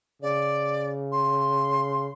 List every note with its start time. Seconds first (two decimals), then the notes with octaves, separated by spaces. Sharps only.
0.22 C#3 D5
1.12 C6